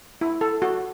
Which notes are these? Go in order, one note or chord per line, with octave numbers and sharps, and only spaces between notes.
E4
A4
F#4